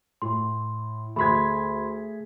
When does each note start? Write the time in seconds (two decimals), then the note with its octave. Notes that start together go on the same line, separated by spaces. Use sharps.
0.22 A2 C6
1.16 D2 A3 G#4 B5 C6 G#6 B6